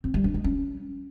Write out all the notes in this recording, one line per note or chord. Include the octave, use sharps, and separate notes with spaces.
C4
G3
D4
G#3
C#4